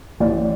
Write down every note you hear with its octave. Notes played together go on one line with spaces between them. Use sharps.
A1 D5